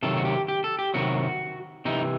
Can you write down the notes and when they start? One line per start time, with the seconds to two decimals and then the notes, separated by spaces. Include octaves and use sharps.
0.03 C3 D#3 F#3 A4
0.17 F#4
0.25 G4
0.48 G4
0.64 A4
0.79 G4
0.94 C3 D#3 F#3 F#4
1.85 C3 E3 D#4